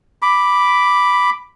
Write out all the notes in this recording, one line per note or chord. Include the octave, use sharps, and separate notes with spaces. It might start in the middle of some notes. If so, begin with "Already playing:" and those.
B5 D6